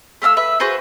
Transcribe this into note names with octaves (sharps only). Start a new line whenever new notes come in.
A3 F5 A#5 E6
B4 E5
F#4 G#4 B4 C5